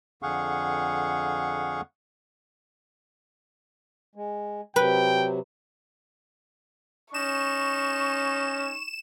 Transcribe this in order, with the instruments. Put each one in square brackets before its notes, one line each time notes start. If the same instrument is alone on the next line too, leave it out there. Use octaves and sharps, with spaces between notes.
[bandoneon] F2 D3 G#4 F5 F#5 C#6
[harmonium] G#3
[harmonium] C3 F#3 [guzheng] B4 [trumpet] G5
[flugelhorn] C#4 [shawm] D#4 [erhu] C#6 [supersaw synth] E7